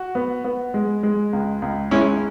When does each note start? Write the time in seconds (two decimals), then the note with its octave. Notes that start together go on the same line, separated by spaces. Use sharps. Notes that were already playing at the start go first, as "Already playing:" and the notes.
Already playing: F#4
0.15 B3
0.44 B3
0.74 G#3
1.03 G#3
1.33 C#2
1.62 C#2
1.91 G#3 C#4 E4